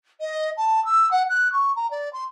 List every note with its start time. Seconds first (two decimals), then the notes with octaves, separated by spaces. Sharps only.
0.20 D#5
0.57 A5
0.85 E6
1.11 F#5
1.29 F#6
1.52 C#6
1.76 A#5
1.90 D5
2.13 C6